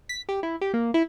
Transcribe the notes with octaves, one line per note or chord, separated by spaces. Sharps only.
B6
G4
E4
G4
A#3
E4